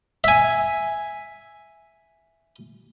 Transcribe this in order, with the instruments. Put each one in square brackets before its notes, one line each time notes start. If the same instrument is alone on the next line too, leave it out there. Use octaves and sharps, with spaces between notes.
[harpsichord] E5 G#5